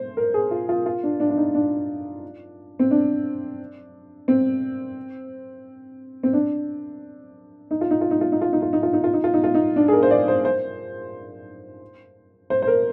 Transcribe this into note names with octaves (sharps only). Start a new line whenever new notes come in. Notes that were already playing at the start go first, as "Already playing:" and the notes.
Already playing: C5
A#4
G#4
F4
F4
F4
D4
D4
D4
D#4
D4
C4
D4
C4
C4
D4
D#4
F4
D#4
F4
D#4
F4
D#4
F4
D#4
F4
D#4
F4
D#4
F4
D#4
F4
D#4
F4
D#4
D4
G#4
A#4
C5
D5
C5
C5
C5
C5
A#4